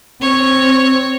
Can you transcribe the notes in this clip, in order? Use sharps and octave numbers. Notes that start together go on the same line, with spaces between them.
C4 C#5